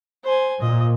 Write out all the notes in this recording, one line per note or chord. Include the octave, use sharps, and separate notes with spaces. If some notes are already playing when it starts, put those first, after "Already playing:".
C5 G#5
A#2 D#5